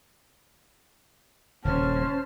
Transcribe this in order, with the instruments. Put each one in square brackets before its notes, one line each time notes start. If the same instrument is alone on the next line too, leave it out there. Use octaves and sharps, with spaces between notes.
[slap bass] D#1 C#3 [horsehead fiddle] C#4 [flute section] C5 A5 F6